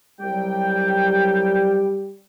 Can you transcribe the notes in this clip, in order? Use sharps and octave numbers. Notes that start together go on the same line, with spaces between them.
C2 F#3 G3 G5